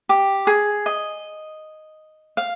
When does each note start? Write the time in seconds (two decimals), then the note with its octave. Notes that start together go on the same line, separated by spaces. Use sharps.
0.09 G4
0.47 G#4
0.86 D#5
2.37 F5